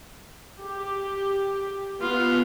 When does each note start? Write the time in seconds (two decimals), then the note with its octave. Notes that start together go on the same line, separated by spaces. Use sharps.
0.59 G4
2.01 B3 F4